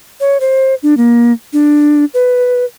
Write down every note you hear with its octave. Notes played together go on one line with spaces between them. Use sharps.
C#5
C5
D4
A#3
D4
B4